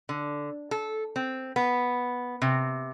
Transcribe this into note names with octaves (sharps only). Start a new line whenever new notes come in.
D3
A4
C4
B3
C3